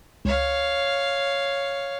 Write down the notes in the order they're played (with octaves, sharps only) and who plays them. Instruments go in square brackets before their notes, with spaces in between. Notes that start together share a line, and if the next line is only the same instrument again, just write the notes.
[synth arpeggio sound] C#2 [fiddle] C#5 F5